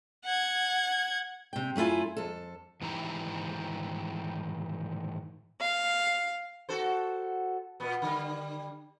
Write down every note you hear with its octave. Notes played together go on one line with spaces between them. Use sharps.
F#5 G#6
C3 G5
F#2 A3 E4 F4 G#5
F2 A4
G#2 D#3 E3 E4 G4 A#5
F5
F#4 A4 C5
A#2 B3
D3 G3